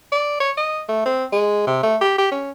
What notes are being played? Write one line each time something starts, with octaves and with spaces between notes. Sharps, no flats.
D5
C#5
D#5
A3
C4
G#3
C3
A3
G4
G4
C#4